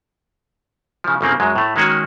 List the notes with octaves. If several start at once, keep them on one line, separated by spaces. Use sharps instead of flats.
C#3 F3
G1 C#3 A#3 C4
F#2 F#3 G#3
A2 A3
D#3 G#3 A#3 C#4 F#4 G#4